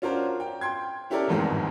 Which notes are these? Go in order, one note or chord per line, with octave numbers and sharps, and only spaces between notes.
C#4 D4 F4 F#4 A#4 C5
G5
G5 C6 G#6
C#4 E4 G4 A4 A#4 D5
D1 G1 F2 G#2 D#3 G#3